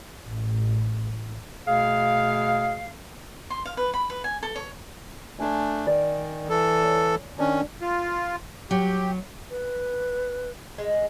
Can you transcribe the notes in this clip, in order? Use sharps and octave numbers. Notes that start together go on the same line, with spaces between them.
A1
B2 A3 G#4 F5
C6
F5
B4
B5
B4
G#5
A4
C#5
A3 D4 G#5 C6
D#3 D5
E3 A4
C#5
D#3 C#4 D4
F4
F#3 G4
B4
G#3